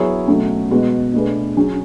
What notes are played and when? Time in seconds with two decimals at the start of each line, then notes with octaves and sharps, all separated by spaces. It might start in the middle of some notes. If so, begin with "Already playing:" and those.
Already playing: F#3 B3 E4 G#4 C#5
0.28 B2 F#3 A3 C#4
0.71 B2 G#3 B3 F#4
1.14 B2 A3 D4 G#4 B4
1.57 F#3 C#4 G#4